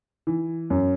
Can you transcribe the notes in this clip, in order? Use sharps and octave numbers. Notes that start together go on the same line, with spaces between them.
E3
F#2